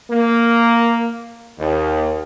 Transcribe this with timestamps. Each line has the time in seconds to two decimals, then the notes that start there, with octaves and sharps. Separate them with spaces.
0.11 A#3
1.58 D#2